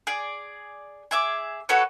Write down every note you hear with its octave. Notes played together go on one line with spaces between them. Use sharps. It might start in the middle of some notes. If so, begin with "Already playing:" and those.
G#4 D5
G#4 E5 D6
F#4 A4 B4 C#5